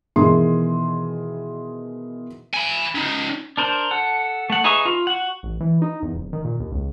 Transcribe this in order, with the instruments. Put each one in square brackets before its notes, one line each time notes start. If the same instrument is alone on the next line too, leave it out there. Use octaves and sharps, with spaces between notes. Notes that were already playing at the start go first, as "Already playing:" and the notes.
[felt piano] B2 D#3 E3 G#4 C6
[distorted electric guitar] G#5 B5
C#4 D#4
[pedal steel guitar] D4 A#4 C5
A4 F#5
A3 F#5
D#4 G#4 B4 E5 C#6
F4
F#4 F#5
[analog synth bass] A1
E3
D#4
E2
D1
D#3
A#2
D#2
C#2